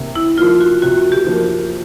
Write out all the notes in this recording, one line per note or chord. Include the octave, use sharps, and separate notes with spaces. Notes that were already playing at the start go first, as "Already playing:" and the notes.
Already playing: C3 A#3
E4
F3 A#3 F4
F#4
C3 F#4
G4
F3 A#3